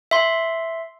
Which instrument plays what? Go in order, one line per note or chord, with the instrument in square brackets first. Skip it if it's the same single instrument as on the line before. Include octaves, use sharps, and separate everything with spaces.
[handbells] E5 C6